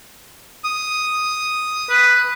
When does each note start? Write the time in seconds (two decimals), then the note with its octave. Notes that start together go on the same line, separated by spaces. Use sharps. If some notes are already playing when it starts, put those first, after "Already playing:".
0.64 D#6
1.89 B4